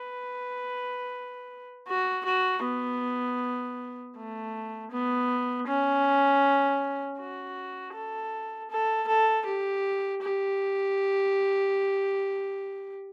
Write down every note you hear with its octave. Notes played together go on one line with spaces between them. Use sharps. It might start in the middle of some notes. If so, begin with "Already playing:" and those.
Already playing: B4
F#4
F#4
B3
A3
B3
C#4
F#4
A4
A4
A4
G4
G4